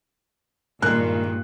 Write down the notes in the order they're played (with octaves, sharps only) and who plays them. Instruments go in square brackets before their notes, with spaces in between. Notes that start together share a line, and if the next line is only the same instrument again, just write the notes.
[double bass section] G2 [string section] A#2 [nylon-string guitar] D#3 G#3 [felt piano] F#6